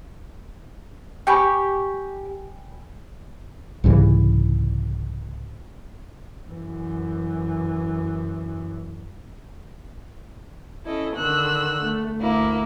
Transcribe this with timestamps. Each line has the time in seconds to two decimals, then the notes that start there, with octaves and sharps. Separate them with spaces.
1.27 G4 G5 G#5 B5 C#6
3.84 C2 G#2 C#3 E3
6.49 F#2 E3
10.86 C#4 E4 A4 D#5
11.16 D3 D#3 E6 F#6
11.82 A3
12.20 D2 A#3 E4